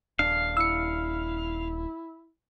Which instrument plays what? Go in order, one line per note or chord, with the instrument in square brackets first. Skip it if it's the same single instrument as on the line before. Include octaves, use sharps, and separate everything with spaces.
[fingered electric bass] D#1 D4 [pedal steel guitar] F5
[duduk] E4 [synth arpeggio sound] E6 C#7